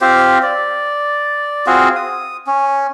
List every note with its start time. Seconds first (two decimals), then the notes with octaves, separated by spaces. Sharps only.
0.01 C4 F4 G4 C5
0.43 D5
1.67 C4 F4 F#4 G#4
1.96 D#6
2.47 C#4